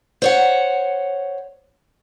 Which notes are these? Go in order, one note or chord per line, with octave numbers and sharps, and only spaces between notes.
C5 C#5 F#5